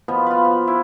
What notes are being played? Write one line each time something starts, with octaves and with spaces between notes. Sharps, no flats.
B2 F3 B3
F4 B4
F3
E4